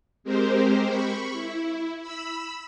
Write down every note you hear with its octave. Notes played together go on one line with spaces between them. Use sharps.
G#3 C4 G4 A#4 C5
B5 C#6
E4
B5 E6